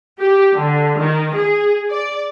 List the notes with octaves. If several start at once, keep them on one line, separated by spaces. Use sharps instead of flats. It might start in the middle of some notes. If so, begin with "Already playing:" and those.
G4
D3
D#3
G#4
D5